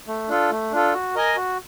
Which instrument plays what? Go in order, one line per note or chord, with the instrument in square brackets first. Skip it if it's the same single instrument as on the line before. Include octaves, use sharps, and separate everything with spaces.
[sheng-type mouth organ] A3
D4 F4 A4
A3
D4 F4 A4
F#4
A#4 D#5 G#5
F#4